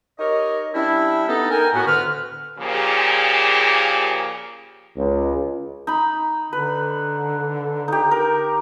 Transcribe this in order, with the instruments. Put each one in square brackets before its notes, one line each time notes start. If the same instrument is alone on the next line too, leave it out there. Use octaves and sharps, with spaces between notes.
[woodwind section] D#4 G4 A#4 C#5 D#5
G3 C#4 D4 E4
B3 D#4 A4
A#4 G5 G#5
A2 B3 F#4
D2 D3 B4 F6
[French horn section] A#2 C#3 F3 A#3 G4 G#4
[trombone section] C#2
[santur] D#4 B5
[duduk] D3 [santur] B4
[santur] D#4 G4
A#4